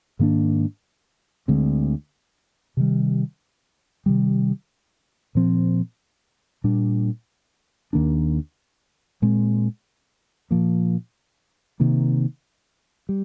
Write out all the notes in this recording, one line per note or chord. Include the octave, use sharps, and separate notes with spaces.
G#2 D#3 A#3 D4
D2 D3 G#3 C4
C3 D#3 G3
C3 D#3 G3
A#2 F3 C4
A#2 G3 D4
D#2 D#3 A#3 D4
A#2 G#3 C4
A#2 F3 A#3
C3 D#3 A#3
G3